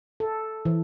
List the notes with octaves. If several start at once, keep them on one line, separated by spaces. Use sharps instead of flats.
A4
E3